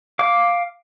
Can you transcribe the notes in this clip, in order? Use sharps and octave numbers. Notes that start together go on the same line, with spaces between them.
F5 D6